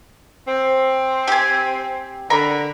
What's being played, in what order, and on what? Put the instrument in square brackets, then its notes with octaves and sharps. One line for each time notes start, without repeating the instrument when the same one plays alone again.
[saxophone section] C4
[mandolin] G4 G#5
[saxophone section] D3 [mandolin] A#4 A#5 B5